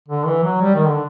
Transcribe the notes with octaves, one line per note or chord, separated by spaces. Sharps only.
D3
E3
F#3
G3
D#3
D3